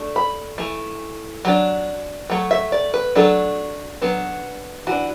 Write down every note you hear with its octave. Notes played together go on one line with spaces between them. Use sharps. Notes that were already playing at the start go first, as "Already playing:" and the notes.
Already playing: A3 D4
B5
E3 A3
F#3 D4
F#3 A3
E5
D5
B4
F#3 A3 D4 A4
F#3 B3 D4
E3 F#4
D4